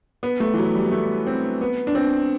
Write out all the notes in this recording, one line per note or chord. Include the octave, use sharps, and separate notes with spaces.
B3
A3
E3
F#3
G3
A3
C4
B3
D4
C4